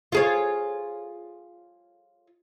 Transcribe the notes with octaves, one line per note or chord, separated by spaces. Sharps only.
F4 G#4 C#5